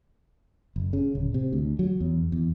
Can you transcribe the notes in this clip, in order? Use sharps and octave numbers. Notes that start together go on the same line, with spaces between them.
F#1
C#3
D1
C3
D2
F#3
E2
E2